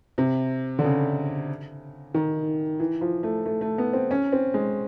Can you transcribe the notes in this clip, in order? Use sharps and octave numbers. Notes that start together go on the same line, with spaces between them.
C3
D3
C#3
D#3
E3
F3
A3
A3
A3
B3
C4
C#4
C4
G#3